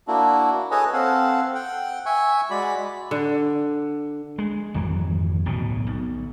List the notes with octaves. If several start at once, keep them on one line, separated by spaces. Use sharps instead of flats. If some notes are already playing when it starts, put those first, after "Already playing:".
A#3 D4 E4 F#4
G#4 A4 B4 C#5 D#5 G#5
C4 A4 F5 F#5
F#5 G5
E5 G#5 C#6
G#3 F#4 D5 B5
D3
G#3
G#1 F2 E3 F#3
D1 B1 B2
B1